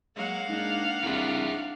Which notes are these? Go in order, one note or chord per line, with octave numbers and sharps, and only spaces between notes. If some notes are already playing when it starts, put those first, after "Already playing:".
F#3 G#3 A#3 F5 F#5
G#2 A#3 D4 D#4
C2 D4 D#4 G#4 E5